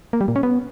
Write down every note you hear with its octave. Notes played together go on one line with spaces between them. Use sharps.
A#3
G3
A#2
C#4
B3